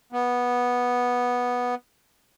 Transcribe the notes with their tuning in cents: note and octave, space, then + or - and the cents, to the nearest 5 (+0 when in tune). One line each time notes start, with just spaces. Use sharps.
B3 -10